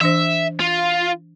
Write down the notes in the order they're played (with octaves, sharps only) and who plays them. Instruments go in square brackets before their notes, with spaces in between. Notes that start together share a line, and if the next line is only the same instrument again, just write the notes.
[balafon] E3 D4 C5 [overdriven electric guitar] E5
[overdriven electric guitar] F4